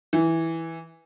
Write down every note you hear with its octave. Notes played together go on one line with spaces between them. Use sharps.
E3